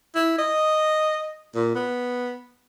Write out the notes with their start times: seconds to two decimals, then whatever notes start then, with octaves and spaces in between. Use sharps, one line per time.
0.15 E4
0.38 D#5
1.55 A#2
1.75 B3